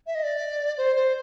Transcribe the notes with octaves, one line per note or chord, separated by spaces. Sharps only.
E5
D#5
D5
C5
C5